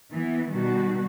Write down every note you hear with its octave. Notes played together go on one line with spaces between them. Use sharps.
E3 B3
B2 D#3 G3 F#4